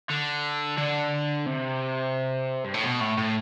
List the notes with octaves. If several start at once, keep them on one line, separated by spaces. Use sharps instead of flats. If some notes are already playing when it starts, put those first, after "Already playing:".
D3
D3
C3
G2
A2
B2
A2
A2